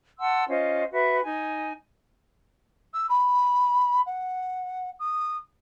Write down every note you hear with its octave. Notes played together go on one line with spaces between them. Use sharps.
F#5 A5 C6 E6
C#4 F4 C5 D#5
F#4 B4 E5
D#4 G#5
E6
B5
F#5
D#6